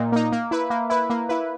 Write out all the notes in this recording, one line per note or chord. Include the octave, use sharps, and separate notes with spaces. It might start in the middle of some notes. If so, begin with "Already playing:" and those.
Already playing: A#2 A#3 D#4
A#3 D#4
A#3
E4 B4
A#3
E4 B4
A#3
E4 B4